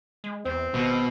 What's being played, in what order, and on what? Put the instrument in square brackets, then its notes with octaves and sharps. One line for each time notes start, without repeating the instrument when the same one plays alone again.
[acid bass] G#3
[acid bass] E2 [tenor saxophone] C4
[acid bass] G#1 [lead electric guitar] B2 B3